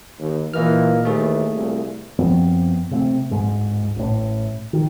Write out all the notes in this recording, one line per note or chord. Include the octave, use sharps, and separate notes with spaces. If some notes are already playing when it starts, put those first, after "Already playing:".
D#2
A#2 E3 A#3 D#5 F6
D#2 E3 A3 G#4
C2 A#2
F#2 F3 B3 C4
C3 A3 A#3 C4
D1 G#2 G#3
A1 A2
D#3